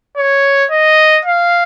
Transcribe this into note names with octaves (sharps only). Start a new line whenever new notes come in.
C#5
D#5
F5